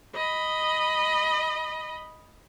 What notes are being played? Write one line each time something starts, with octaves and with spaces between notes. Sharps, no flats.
D#5 B5